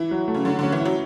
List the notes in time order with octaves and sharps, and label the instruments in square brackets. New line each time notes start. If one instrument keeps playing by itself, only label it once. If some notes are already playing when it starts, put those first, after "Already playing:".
Already playing: [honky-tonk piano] E3 [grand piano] E4
[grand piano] F#3
A3
[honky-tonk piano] C#3
[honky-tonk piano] D3 [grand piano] F#3
[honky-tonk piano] D3 [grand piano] C#4
[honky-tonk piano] E3
[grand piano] E4
[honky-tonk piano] F#3